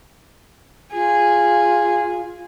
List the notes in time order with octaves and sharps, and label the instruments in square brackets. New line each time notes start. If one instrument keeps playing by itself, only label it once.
[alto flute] F4 [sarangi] G#4